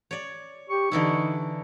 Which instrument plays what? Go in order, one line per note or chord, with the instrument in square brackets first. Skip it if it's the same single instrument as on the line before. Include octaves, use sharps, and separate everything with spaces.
[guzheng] C#5 D5
[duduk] G4 [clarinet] C#6
[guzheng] D3 E3 E4 [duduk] D#4